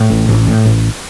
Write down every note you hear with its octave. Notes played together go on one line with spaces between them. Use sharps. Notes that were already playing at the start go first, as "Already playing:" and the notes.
Already playing: A2
A1
A1
A2
A1